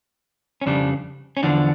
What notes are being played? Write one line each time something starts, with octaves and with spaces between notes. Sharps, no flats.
C#4
F2 C#3 G3 D4
C#4
E2 D3 F3 D4